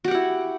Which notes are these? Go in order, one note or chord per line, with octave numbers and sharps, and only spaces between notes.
E4 F#4 G4 F#5